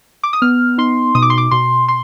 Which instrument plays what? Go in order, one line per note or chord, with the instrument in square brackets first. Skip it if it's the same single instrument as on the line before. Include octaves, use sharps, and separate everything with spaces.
[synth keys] D6
D#6
B3 F6
D#4 C6
B2 D#6
D6
C6
D6
B2 C6
C6